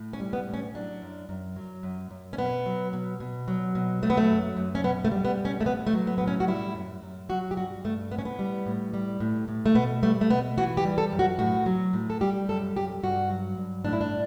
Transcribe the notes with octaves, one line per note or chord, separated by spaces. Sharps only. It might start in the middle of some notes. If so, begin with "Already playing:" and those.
Already playing: A2
C#4
G3
B3
A2
C#4
F#3 D4
F#2
F#2
F#3
F#2
F#2
C#4
B2 B3
F#3
B2
B2
F#3
B2
F#3 A3
B3
A3
F#2
F#2
C#4
B2 B3
A3
G3
B3
B2
C#4
A3
A2 B3
A3
F#3
B3
A2 B3
C#4
F#4
G3 E4
F#2
F#2
F#3 F#4
G4
G2 F#4
G2 A3
A2 B3
C#4
B3
G3
A2
G3
A2
A2
A3
B2 B3
G3 A3
A3
B2 B3
E3 F#4
G4
G3
A4
F#2
F#4
A2 F#4
F#3
A2
A4
G3 G4
F#2 A4
F#2 G4
G2 F#4
F#3
G2
A2 D4
E4
D4